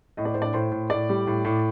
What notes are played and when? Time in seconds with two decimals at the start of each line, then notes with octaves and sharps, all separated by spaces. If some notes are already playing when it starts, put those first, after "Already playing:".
0.17 A2 D#5
0.25 D5
0.34 A2 C5
0.42 D4 D5
0.54 A2 C5 C6
0.72 A2
0.90 A2 D5 D6
1.09 G3
1.27 A2
1.45 A2